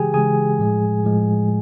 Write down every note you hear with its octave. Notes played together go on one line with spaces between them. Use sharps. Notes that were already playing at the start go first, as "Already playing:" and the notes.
Already playing: C#3 E3 G#3 G4 G#4 G5 G#5
C#3 E3 G#3 G#4 G#5
A2 F3 G#3
A2 F3 G#3